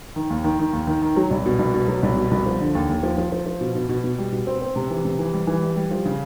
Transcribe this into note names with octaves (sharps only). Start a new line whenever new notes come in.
D#3
D#2
D#3
D#3
D#2
D#3
D#3
F#3
C2
B2
C2
B2
F#3
C2
B2
C2
F3
D3
D#2
D#2
F3
F3
F3
F3
B2
B2
B2
B2
G3
B2
C4
C4
C3
E3
C3
E3
G3
E3
G3
G3
F3
C#3